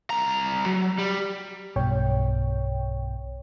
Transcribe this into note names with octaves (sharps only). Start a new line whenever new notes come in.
C2 A#5
F#3
G3
B1 G2 B2 C#5 G5